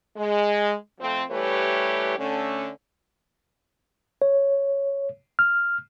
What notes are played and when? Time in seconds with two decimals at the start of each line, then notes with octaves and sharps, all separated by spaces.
0.17 G#3
1.00 F2 F3 A3 C4
1.31 E3 G3 A3 G4 B4 C#5
2.17 D3 A3 C#4
4.22 C#5
5.39 F6